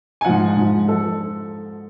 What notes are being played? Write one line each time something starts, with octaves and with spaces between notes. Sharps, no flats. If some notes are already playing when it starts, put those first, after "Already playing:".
G#5
G#2 F3 F#5
G#2 F3
F3 A4